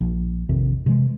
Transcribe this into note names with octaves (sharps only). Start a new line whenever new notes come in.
A#1
A#1 F2 C3 D#3
C3 E3 G3 G#3